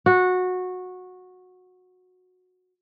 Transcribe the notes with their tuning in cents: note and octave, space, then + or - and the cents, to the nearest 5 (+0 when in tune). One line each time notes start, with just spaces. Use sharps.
F#4 -15